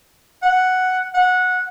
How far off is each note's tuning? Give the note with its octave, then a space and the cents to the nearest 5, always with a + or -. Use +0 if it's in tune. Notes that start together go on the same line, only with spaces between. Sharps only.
F#5 +0
F#5 -15